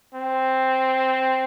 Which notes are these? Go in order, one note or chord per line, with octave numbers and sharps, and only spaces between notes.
C4